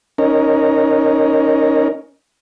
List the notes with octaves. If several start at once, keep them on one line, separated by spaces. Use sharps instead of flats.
C#4 D#4 A#4